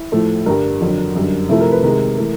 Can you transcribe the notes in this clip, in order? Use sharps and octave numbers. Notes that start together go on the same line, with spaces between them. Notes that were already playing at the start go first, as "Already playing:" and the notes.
Already playing: E4
A2 F3 A3
G2 D3 G3 A#4
F2 D3 F#3
F#2 D3 G3
C3 F3 A3 E4
A#4
B4
C3 D#3 G#3 A#4
E3 A3